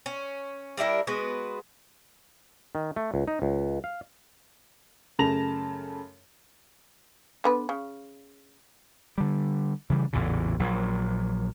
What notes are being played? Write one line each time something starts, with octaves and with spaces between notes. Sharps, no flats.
C#4
G3 D4 E4 A#4
G#3 B3 F#4 B4
D#3
A3
C#2
D#4
C#2
F5
F#2 C#3 A3 A5 A#6 F7
D3 B3 B4
C#3
D3 G3
C#3 E3 G3
A1 E2 A#2 C#3
A#1 F#3